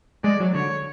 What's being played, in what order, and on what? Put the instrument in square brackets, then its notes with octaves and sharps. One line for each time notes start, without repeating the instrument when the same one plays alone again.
[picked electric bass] G#3 [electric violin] D5
[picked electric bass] F#3
[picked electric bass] D3 [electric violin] C#5